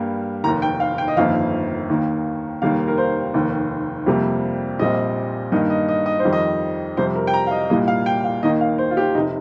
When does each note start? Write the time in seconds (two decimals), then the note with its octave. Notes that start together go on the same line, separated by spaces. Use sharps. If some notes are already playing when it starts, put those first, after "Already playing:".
Already playing: G2 G3 A#3
0.44 F1 D#2 D#3 A#5
0.62 G5
0.80 F5
0.98 G5
1.08 D#5
1.17 G1 F2 D#3 A#3 F5
1.89 D#2 D#3 A#3
2.62 F1 D#2 D#3 G3 A#3 F5
2.88 A#4
2.98 C5
3.34 F1 D#2 D#3
4.06 F2 C3 G3 A#3
4.79 A#1 A#2 G3 C4 D#5
5.52 G2 D#3 A#3 D#5
5.70 D#5
5.88 D#5
6.06 D#5
6.19 C5
6.25 F2 D#3 G3
6.33 D#5
6.97 F2 C3 G3 C5
7.15 A#4
7.27 G5
7.34 A#5
7.47 F5
7.51 D#5
7.70 C2 A#2 G3 A#3 D#5
7.88 F5
8.06 G5
8.24 F5
8.42 D#2 D#3 A#3 D#5
8.61 F5
8.78 C5
8.91 F4
8.97 G4
9.15 F1 C3 D#4